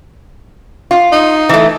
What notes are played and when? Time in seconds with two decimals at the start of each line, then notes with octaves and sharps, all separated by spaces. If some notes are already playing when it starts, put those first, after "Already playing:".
0.91 F4
1.12 D#4
1.49 E3 A3